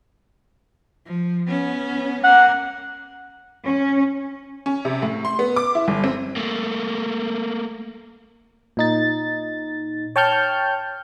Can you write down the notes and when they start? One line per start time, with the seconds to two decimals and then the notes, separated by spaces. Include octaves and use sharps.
1.07 F3
1.48 B3 C#4
2.24 A#3 F#5
3.68 C#4
4.66 C#4
4.85 C3
5.02 A2
5.25 C6
5.39 B3
5.56 D6
5.75 E4
5.88 G1
6.04 C4
6.36 A3 A#3
8.77 A#2 D#4 A6
10.16 C#5 G5 A5 C#6 F6 G6